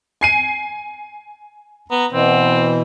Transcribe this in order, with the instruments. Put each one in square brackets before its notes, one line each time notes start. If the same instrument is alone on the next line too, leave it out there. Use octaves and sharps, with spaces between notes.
[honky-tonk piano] G#5 C7 D#7
[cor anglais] B3 [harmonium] A#5
[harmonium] B2 E3 [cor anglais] C4